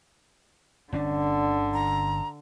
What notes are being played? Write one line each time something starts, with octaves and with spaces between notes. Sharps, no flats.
G1 D3 C#4 D4 D5
A#5